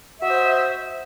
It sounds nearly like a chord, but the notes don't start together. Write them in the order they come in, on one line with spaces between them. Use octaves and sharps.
E5 F#4 D#5 C5